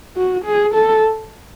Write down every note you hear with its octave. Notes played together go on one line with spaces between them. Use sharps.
F#4
G#4
A4